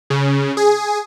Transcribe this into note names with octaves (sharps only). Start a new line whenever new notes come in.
C#3
G#4